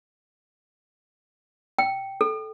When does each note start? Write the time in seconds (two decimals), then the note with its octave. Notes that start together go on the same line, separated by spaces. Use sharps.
1.79 G5
2.21 A4